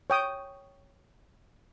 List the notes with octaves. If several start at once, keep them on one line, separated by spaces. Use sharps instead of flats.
C#5 G5 D#6